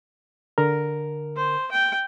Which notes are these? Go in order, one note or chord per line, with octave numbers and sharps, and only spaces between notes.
D3 A#4
C5
G5